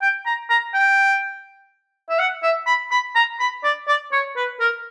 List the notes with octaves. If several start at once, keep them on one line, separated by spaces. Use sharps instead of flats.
G5
A#5
A#5
G5
E5
F#5
E5
B5
B5
A#5
B5
D5
D5
C#5
B4
A#4